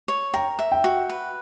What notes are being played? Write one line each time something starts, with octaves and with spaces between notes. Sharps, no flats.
C#5
A#4 G5
E5
G5
F#4
B4